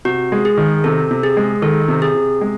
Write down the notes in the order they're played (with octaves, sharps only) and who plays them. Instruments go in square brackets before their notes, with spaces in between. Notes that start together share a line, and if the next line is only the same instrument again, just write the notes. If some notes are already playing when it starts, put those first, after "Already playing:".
[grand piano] C3 [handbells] F#4
[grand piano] G#3
[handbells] G#4
[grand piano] D#3
[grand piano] C3 [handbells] A4
[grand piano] C3
[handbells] G#4
[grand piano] G#3
[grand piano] D#3 [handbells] A4
[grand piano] C3
[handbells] G#4
[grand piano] C3
G#3